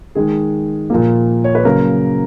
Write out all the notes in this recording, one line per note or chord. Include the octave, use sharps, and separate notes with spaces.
D#3 G#3 G#4
A#2 F3 A#3
C#5
B4
C#3 F#3 A#3 A#4